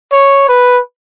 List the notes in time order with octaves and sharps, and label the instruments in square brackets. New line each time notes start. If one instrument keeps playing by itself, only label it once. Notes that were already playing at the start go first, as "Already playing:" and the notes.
[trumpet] C#5
B4